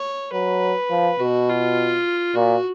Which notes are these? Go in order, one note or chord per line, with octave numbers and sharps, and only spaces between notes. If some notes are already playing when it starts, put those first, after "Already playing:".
Already playing: C#5
F#3 B4
F3
B2 F#4
F4
A#2 F#4